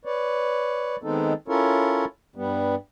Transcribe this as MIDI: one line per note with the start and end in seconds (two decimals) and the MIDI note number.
0.05 0.96 71
0.05 0.96 73
0.05 0.96 74
1.03 1.33 51
1.03 1.33 56
1.03 1.33 59
1.03 1.33 60
1.03 1.33 63
1.03 1.33 69
1.48 2.05 61
1.48 2.05 64
1.48 2.05 65
1.48 2.05 69
1.48 2.05 70
1.48 2.05 73
2.36 2.75 43
2.36 2.75 55
2.36 2.75 59